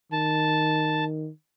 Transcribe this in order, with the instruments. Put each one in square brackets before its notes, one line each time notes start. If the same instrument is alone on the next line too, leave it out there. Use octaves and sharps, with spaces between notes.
[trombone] D#3 [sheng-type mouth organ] A5